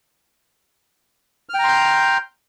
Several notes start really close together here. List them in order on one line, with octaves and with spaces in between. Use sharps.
F6 G5 A#5 C6 G6